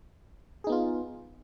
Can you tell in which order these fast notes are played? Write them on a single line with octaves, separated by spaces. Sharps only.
G#4 D#4 B3 F4